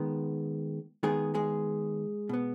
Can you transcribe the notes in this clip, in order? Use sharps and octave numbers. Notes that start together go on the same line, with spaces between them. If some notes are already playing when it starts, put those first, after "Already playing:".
Already playing: D#3 G#3 B3
D#3 G#3 B3 G#4
G#3 G#4
B2 B3